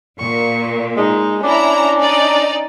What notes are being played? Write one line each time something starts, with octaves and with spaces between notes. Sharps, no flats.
A#2 C#6
G#3 D#4
C#4 D4 E4 A#5
D#4 D5